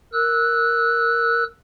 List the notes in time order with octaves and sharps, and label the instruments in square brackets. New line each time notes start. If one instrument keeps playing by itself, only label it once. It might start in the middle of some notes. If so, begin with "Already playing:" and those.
[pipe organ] A#4 E6 F#6